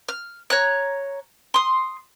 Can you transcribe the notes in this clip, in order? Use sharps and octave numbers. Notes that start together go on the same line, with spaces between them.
F6
C#5 A#5 F#6
C6 D#6